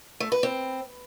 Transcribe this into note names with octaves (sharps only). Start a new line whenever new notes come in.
A3
B4
C4